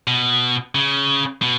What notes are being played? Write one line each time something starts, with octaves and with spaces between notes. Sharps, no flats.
B2
C#3
B2